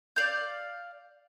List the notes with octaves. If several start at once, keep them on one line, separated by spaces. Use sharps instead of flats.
D5 F5 G6